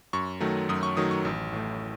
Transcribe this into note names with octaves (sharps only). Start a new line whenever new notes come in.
F#2 C#6
D#3 F#3 A3
F#2 D#6
C#6
D#3 F#3 A3 D#6
C#6
A1
A2 A3